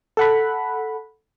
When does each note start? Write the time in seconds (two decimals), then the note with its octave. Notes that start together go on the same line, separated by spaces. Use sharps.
0.17 A4 F#5 B5